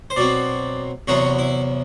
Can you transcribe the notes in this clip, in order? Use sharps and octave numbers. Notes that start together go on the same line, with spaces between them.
C5
B2 F#3 C4 D5
E2 C3 F#3 B3 F#4
E4